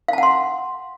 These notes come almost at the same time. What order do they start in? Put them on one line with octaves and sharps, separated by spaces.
F5 A5 F#5 C6